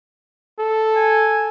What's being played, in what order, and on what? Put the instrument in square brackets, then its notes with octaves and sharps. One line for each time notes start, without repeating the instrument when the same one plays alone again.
[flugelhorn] A4
[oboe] G#5